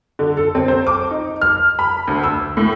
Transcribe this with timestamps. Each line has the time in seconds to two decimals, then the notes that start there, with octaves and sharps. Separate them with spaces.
0.19 D3
0.37 A4
0.55 C4
0.68 C5
0.87 D6
1.11 D#4
1.42 F6
1.79 B5
2.08 D2
2.24 E6
2.57 A2